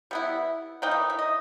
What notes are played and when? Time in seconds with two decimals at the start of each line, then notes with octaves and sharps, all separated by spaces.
0.11 G3 B3 E4
0.82 E3 A#3 D#4 G5
0.91 E5
1.10 E5
1.19 D#5